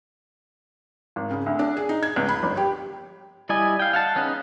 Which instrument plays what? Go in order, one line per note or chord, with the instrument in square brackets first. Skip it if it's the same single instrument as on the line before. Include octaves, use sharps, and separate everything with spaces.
[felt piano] G#1
C#3
D2
D4
G#4
D#4
G#6
C#2
B5
G1
G4
[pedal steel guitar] G3 E4 D5 D#5 G#5
F5 G5
F5 F#5 A5
B3 C#4 D#4 G#4 F#6